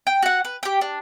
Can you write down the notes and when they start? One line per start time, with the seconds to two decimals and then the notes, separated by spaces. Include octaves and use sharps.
0.07 G5
0.23 F#4 F#5
0.45 B4
0.63 G4 G5
0.81 D4